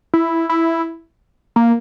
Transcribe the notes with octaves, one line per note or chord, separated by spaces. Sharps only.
E4
E4
A#3